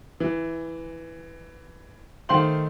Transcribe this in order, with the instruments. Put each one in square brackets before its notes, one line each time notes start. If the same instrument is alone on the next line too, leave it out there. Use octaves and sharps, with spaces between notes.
[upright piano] E3
D#3 A3 C5 F5 C6 F#7